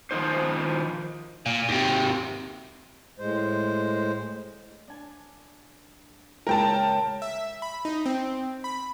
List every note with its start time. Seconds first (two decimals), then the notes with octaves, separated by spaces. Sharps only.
0.11 D#3 F3 D#4 C5
1.46 A#2
1.69 D#2 C3
3.20 A2 G#3 C5
4.88 D4 G#5
6.47 A#2 C#3 G#3 A#4 G5 A5
7.22 E5
7.62 B5
7.85 D#4
8.06 C4
8.64 B5